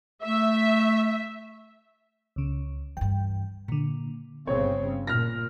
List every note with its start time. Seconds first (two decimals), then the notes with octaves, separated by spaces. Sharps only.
0.24 A3 E5
2.36 C#2 C#3
2.97 G2 E3 G5
3.68 A#2 D3 A#3
4.47 G1 C#3 C4 C#5
5.07 A#2 F6 A#6